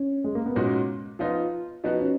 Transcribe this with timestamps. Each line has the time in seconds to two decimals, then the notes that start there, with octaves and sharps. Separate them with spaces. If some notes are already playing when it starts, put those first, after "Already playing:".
Already playing: C#4
0.24 G#3
0.35 A#3
0.46 B3
0.55 A#2 G#3 C#4 D#4 F#4
1.19 F3 B3 D#4 F4
1.84 F3 B3 D#4 F#4
2.00 C#4